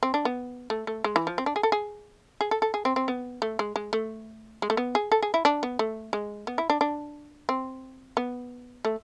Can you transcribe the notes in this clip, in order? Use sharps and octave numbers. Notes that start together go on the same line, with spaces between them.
C4
D4
B3
A3
A3
G#3
E3
F3
C4
D4
G#4
A4
G#4
G#4
A4
A4
G#4
C4
C4
B3
A3
G#3
G#3
A3
G#3
A3
B3
G#4
A4
G#4
E4
D4
B3
A3
G#3
B3
E4
D4
D4
C4
B3
A3